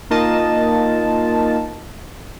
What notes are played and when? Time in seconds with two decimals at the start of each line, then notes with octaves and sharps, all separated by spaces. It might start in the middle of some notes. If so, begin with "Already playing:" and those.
0.10 A#3 D#4 F4 A#4 D#5 A5